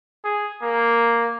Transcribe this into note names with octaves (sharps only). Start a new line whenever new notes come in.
G#4
A#3